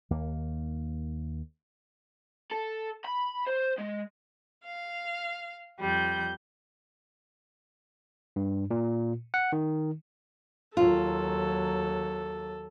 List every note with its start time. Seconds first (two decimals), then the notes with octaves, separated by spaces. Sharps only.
0.10 D#2 A#3
2.51 A4
3.05 B5
3.47 C5
3.78 G#3
4.64 F5
5.78 F2 G3 G6
8.36 G2
8.71 A#2
9.34 F#5
9.52 D#3
10.77 D#2 F#3 F4 A4